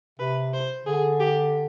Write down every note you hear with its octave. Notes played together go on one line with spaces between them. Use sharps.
C3 B4
C5
D3 G#4
G4